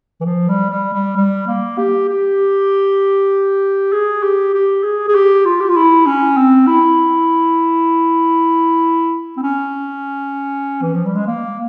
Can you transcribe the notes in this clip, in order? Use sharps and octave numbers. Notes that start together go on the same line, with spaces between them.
E3
F3
G3
G3
G3
G3
A#3
G4
G4
G#4
G4
G4
G#4
G#4
G4
F4
G4
F4
E4
C#4
C4
E4
C4
C#4
E3
F3
G3
G#3
A#3